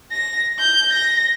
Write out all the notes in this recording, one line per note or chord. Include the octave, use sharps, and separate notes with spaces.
A#6
G6
A#6